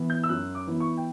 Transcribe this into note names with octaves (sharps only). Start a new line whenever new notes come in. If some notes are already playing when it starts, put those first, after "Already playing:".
Already playing: E3 B3 E4
G6
E6
F#2 F#6
D6
E3 B3 E4
C#6
G5